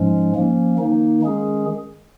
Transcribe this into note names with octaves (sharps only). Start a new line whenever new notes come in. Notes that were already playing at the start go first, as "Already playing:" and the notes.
Already playing: G#2 F3 G#3 C#4
F3 A#3 C#4
D#3 A#3 D#4
D#3 G#3 C#4 G#4